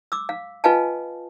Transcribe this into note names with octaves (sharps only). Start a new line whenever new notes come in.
D6 E6
F5
F4 B4 D#5 F5 G#5 A5